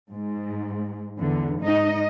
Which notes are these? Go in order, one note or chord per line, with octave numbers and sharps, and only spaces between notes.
G#2
E2 D3
G#2 D#4 D#5